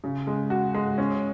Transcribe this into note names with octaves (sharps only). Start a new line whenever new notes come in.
C#3
G#3
F#4
G#3
C#4